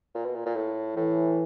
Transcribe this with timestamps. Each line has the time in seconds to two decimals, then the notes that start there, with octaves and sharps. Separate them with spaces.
0.15 A#2
0.25 B2
0.35 A#2
0.46 A#2
0.56 A2
0.96 A2 E3